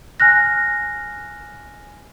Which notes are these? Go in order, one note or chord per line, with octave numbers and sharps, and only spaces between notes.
G#5 F6 F#6 A#6